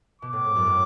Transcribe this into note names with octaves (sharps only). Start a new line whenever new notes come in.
B2 D6
A2
G#2
F#2
A2